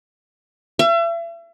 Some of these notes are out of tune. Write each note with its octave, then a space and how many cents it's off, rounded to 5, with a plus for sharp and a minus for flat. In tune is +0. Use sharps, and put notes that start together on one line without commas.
E5 +40